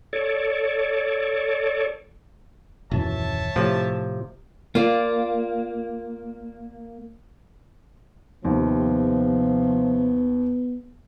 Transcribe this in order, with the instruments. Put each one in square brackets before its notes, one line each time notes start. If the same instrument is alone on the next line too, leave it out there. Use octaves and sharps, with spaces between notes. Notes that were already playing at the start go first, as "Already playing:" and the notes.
[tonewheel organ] A4 C#5 D5
[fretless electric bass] D#1 F#2 E3 [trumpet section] C#5 E5 A5
[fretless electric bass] A2 [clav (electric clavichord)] C3 F3
[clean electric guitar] A#3 [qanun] F4 D5
[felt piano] D#2 [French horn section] C3 F3 [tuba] B3